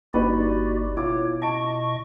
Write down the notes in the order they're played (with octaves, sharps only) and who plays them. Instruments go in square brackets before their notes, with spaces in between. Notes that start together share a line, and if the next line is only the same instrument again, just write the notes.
[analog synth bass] G1 [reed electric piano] A#3 [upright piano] D4 D#4 B4 [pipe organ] F#4 G4 D5
[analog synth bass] B2 [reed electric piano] E4 [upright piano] F4 D6 [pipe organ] C#5
[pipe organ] D#5 C#6 [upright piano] A5 D7